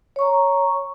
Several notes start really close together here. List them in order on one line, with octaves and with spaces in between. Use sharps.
C#5 C#6 A#5